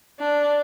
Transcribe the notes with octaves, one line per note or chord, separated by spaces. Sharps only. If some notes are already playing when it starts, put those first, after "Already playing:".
D4